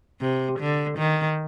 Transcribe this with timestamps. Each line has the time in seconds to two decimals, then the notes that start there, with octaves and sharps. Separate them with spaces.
0.21 C3
0.60 D3
0.98 D#3